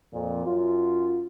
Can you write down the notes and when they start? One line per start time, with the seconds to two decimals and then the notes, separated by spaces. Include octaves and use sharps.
0.13 F2 A#2
0.46 F#2 F4